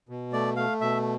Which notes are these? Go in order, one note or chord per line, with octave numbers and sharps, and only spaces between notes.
B2
A3 D5
A3 F5
B2 E5